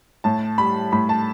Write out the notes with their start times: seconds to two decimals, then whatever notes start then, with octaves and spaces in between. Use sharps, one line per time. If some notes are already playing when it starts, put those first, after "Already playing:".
0.24 A2 A5
0.58 G3 B5
0.92 A2 B5
1.09 A5